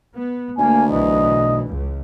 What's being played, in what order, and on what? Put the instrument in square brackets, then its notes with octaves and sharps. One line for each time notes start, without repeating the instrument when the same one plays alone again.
[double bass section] B3
[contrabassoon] D2 [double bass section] A#3 [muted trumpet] G#5
[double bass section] B1 E3 [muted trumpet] D#5
[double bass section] C#2